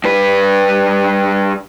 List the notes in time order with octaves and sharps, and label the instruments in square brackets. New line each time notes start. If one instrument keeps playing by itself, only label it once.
[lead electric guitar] G2 B4